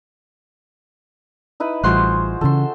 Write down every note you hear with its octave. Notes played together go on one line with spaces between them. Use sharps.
D#4 E4 B4
A1 G3 F4 F#4 G#4 C5 C6 F#6
C#3 E3 A4 C6